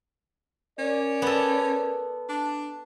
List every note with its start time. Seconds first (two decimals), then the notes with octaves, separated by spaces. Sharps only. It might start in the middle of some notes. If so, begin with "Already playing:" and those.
0.79 C#4 A#4 D5
1.22 B3 A4
2.29 D4